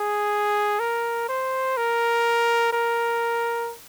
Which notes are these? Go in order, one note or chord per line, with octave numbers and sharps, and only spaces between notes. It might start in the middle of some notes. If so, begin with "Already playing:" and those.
Already playing: G#4
A#4
C5
A#4
A#4